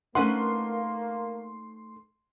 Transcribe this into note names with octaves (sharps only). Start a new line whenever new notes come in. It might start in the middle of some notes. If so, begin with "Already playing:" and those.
A3 A#3 C#4 D#4 B4 C5 F#5 C6